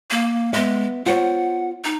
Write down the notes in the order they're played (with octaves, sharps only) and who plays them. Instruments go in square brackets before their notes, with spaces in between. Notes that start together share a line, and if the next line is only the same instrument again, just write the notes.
[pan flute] A#3
[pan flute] G#3 [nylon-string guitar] B3 E5
[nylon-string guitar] F4 C5 C#5 [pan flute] F#5
[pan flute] D#4